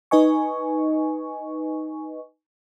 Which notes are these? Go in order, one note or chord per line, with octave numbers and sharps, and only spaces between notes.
D#4 B4 D#5 G#5 C#6